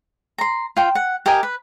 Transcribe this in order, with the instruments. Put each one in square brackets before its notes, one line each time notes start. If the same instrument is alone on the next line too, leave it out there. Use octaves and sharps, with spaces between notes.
[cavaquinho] A#5 C6
F4 G5
F#5
G4 A#4 D#5 G#5
B4